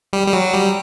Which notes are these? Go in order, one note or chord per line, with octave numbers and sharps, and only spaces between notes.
G3
G3
F#3
G3